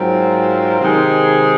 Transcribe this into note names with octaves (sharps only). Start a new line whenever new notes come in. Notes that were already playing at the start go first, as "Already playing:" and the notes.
Already playing: G#2 F#3 C4 F4 A#4
C3 D#3 G#3 D#4 G#4